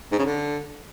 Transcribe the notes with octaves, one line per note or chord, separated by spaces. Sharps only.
G#2
C#3
D3